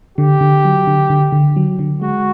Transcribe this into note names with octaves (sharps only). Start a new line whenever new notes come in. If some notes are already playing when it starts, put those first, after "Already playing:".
D3 G4
D3
F#3
D3
D3
D3
F#3
D3
G#3 F#4